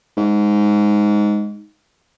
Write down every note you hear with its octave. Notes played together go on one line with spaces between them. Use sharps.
G#2